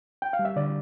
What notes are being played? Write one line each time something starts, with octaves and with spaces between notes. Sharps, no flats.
G5
F5
G3
E5
D3 D5